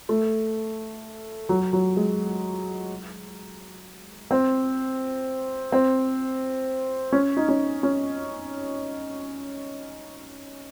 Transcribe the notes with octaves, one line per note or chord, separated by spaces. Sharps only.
A3
F#3
F#3
G#3
C4
C4
C#4
D#4
C#4
C#4